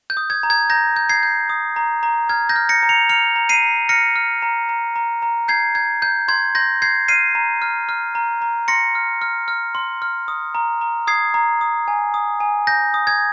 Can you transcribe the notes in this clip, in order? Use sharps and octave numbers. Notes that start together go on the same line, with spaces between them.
G6
D#6
G#6
A#5
G#6
A#5 G6 A#6
G6
G#6 C7
G6
D#6
A#5
A#5
F6 G#6
G6 A#6
F6
A#6 C#7
A#5
C#7 F7
F6 C#7 F7
A#5
C7 D#7
A#5
F6 A#6 C#7
F6
A#5
A#5
A#5
A#5
G6 G#6 C7
G6 G#6
G6
C6 G#6
C6 G6 A#6
G6 G#6 C7
F6 C7 D#7
A#5
F6
F6
A#5
A#5
C6 A#6 C#7
F6
F6
F6
C6
F6
D#6
A#5
A#5
D#6 G#6 C7
A#5
D#6
G#5
D#6
G#5
G6 A#6
D#6
G#6